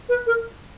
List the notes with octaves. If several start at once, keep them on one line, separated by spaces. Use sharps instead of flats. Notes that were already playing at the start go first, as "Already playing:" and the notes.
B4
A#4